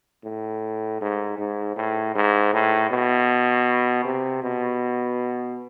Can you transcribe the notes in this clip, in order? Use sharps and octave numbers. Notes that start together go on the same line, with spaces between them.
A2
G#2
G#2
A2
G#2
A2
B2
C3
B2